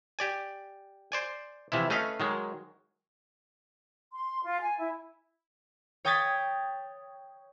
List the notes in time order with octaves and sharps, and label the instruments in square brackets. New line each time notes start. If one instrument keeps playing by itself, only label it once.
[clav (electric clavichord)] G4 D5 G#5
C5 D5 G#5
C3 E3 F3 E4
A3 C#4 B4 D#5 F5
D#3 F#3 G#3
[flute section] C6
F4
G#5
E4
[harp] C#5 G5 D#6 G#6 A6 B6